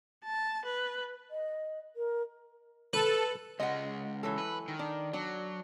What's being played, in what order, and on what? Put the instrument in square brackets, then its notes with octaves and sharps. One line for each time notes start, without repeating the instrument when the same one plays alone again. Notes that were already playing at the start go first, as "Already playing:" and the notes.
[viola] A5
B4
[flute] D#5
A#4
[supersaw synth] A4 [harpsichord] B4
[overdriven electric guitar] C#2 G#3 [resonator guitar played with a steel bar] D#5 F#5
[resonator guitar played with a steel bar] E3 F#3 A4
[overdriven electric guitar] B4
D#3
[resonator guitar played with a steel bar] D4
[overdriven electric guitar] F#3 [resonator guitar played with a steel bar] D4